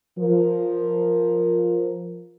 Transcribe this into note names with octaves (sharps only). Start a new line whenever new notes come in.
F3 A#4